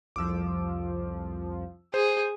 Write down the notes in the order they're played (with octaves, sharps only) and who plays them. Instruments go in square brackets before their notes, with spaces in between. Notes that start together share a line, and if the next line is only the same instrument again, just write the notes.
[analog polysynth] C2 F2 F3 [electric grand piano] D6 E6
[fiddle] G#4 [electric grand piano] C5